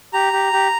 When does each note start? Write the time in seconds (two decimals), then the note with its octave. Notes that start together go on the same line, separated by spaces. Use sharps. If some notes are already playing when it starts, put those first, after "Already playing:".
0.13 G4 A#5
0.33 G4
0.53 G4